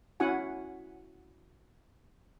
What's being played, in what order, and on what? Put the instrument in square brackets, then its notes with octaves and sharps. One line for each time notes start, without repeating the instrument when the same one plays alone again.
[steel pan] C#4 E4 F#4 F#5 G#5